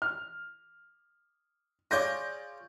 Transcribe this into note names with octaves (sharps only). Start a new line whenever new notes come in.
F6
F4 G#4 C#5 D5 G6 A#6